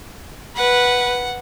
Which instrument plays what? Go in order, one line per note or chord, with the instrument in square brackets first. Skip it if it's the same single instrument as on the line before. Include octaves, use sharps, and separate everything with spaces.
[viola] B4 [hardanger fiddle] F#5